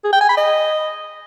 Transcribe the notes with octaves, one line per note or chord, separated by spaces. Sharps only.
G#4
G5
G#5
B5
D#5